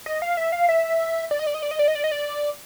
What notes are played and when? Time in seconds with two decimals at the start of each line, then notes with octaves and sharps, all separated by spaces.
0.06 D#5
0.22 F5
0.37 E5
0.52 F5
0.69 E5
1.31 D5
1.39 D#5
1.47 D5
1.54 D#5
1.62 D5
1.71 D#5
1.79 D5
1.88 D#5
1.95 D5
2.04 D#5
2.11 D5